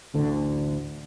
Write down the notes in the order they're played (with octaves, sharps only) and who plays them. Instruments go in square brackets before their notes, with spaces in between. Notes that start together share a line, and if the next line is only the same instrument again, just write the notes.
[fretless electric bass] A1 D2 D3